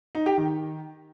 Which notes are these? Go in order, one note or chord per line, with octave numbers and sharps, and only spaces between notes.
D#4
G4
D#3